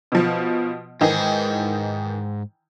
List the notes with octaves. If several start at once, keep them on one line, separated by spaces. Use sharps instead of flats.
B2 F3
G#2 D#3 E3 G#4